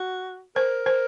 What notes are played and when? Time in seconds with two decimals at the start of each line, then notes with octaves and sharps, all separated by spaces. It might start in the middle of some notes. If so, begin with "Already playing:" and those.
Already playing: F#4
0.56 A#4 C5
0.86 C5